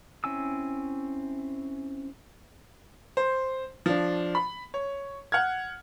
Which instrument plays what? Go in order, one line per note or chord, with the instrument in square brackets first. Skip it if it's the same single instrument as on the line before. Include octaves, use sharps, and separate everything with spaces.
[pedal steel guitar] C4 C#4 E4 G#5 E6
[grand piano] C5
F3 D4
B5
C#5
F#5 F6 G#6